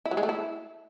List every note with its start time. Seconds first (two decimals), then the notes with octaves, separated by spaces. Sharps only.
0.05 E4
0.11 F#3
0.17 G#3
0.23 A3
0.29 E4